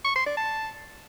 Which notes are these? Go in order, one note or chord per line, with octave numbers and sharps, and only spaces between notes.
C#6
C6
D5
A5